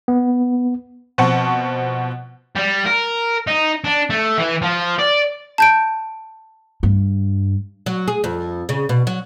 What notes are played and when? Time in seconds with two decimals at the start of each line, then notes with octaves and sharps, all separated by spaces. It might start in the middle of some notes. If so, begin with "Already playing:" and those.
0.08 B3
1.18 B2 F3 C4 F#5 A5 C#6
2.55 G3
2.86 A#4
3.47 D#4
3.84 D4
4.10 A3
4.38 E3
4.62 F3
4.99 D5
5.58 A5 G6 D7
6.83 G2
7.86 F#3
8.08 G#4
8.24 F2
8.69 C#3
8.89 B2
9.07 F#3